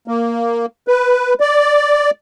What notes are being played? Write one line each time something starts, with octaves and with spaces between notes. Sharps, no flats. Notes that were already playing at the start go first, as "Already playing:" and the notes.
A#3
B4
D5